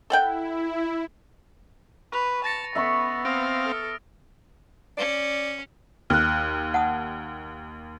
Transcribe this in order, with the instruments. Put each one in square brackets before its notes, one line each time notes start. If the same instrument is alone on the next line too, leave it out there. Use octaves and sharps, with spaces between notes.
[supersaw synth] E4 [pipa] A4 F#5 G5
[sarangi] B4 [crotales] C#6 F7
[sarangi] A5 [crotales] A6 A#6 C#7
[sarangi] B3 [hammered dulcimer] E5 B5 C#6
[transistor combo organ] C4 F5 [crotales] D#6 A#6 D7
[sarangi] A4 [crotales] F6
[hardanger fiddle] C#4 [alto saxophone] D5
[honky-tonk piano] D#2 [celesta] F6 F#6
[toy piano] F#5 A5 D#6